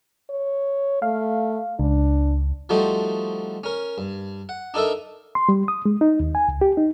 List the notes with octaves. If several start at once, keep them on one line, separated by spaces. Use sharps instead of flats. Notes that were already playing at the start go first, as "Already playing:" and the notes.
C#5
A3 F5
C#2 D4
F3 G3 A3 D#4 F#4 C5
C#4 A#4
G2
F#5
D4 D#4 A4 A#4 E5
C6
G3
D#6
G#3
D#4
D#2
G#5
C#2
G4
D#4